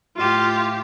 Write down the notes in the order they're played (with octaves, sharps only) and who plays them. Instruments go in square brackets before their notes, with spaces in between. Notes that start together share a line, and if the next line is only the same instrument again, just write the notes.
[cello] A2 G4 [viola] F4 F5